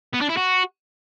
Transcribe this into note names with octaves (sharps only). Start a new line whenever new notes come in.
B3
D4
E4
F#4